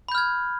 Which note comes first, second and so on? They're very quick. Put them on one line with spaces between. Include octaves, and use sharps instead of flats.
B5 G6 F6 G#6